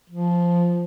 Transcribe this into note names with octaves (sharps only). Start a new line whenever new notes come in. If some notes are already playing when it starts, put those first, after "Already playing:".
F3